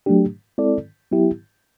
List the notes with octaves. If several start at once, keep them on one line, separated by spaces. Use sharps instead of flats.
F#3 A3 D4 G4
G#3 C4 E4 A4 D5
F#3 B3 E4 G4